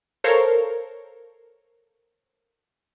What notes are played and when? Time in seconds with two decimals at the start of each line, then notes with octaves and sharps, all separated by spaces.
0.24 A4 A#4 C5 C#5 F5